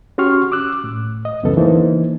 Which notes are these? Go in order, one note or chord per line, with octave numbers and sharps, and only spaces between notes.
C#4 F#4 G4 C6 C#6 F6
D6 E6 F#6
A2
D#5
C#2 F#2 C#3 E3 B3 A4
E3 A#3 D#4 C5